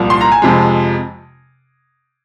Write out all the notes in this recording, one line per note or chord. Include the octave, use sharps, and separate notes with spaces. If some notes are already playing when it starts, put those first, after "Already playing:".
Already playing: C2 A#2 F3
C6
A#5
G#5
F2 C3 F3 G#3